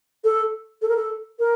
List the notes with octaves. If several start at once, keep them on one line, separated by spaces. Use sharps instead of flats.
A4
A4
A#4
A4
A#4